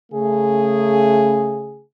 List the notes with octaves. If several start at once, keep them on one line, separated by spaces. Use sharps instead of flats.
C#3 A3 G#4